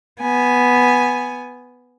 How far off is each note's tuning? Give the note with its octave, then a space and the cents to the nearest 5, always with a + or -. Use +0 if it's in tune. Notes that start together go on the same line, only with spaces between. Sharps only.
B3 +0 G#5 +0